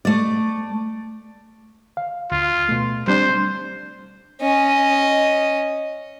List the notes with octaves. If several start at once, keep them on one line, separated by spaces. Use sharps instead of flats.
A3 D5
F5
D2 F4
B2 A3
G3 C4 D4 C5
C#4 D#5